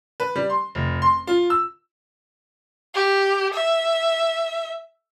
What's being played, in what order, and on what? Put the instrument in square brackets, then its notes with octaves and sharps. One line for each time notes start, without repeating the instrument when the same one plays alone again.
[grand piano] B4
G3
C6
F1
C6
F4
E6
[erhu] G4
E5